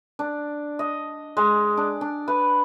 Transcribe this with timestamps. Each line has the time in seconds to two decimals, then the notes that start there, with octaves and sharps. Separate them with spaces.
0.19 D4
0.79 D#5
1.37 G#3
1.77 D4
2.01 D4
2.28 B4